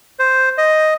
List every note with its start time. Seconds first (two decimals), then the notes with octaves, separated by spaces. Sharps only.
0.19 C5
0.58 D#5